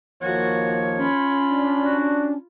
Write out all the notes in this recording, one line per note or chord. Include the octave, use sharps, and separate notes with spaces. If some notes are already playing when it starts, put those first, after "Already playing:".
D#2 F3 A#3 F#4 C#5
C#4 F4 B5
D4
F#4